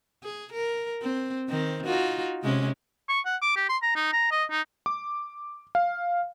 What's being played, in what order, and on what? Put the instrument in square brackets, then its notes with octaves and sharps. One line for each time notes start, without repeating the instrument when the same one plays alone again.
[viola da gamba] G#4
A#4
C4
D#3 C4
D#4 F4 F#4
C3 G#3 C#4
[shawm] C#6
F#5
D6
G4
C6
A#5
D#4
A#5
D#5
D#4
[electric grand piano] D6
F5